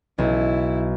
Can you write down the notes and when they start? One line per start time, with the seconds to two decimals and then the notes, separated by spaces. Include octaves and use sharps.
0.18 B1 E4